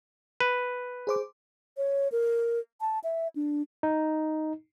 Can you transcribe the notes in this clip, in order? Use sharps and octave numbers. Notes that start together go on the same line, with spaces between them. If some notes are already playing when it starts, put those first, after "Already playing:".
B4
G#4 C5 D6
C#5
A#4
A5
E5
D4
D#4